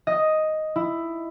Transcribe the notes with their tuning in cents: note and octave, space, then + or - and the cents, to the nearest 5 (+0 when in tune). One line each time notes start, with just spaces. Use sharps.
D#5 +5
E4 +10